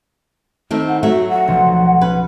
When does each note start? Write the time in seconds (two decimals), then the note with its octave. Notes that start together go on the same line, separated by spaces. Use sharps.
0.71 D#3 A3 C4
0.88 F#5
1.03 F#3 A3 F#4 E5
1.29 F#5
1.48 B1 F3
2.01 C#4 B4